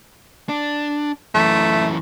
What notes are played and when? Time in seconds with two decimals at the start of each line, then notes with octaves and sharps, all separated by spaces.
0.49 D4
1.35 F#2 E3 A3